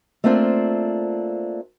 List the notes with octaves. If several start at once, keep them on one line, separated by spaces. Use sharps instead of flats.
A3 A#3 C4 D4 F4 C5